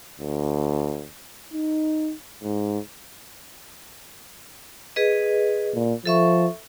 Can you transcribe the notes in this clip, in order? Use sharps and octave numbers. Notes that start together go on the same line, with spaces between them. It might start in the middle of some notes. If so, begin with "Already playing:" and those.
D2
D#4
G#2
G#4 B4 D#5
A#2
F3 A4 E5 C#6